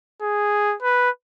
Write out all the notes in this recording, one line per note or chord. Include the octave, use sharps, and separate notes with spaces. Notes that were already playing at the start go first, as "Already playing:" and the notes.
G#4
B4